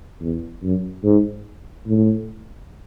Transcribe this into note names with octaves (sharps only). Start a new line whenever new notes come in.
E2
F#2
G#2
A2